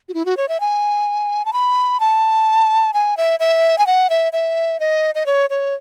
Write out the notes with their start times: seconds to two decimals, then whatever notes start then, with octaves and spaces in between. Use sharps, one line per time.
0.09 F#4
0.14 E4
0.26 F#4
0.37 C#5
0.49 E5
0.60 G#5
1.45 A5
1.53 B5
2.00 A5
2.94 G#5
3.17 E5
3.40 E5
3.78 G#5
3.87 F#5
4.10 E5
4.33 E5
4.80 D#5
5.15 D#5
5.26 C#5
5.50 C#5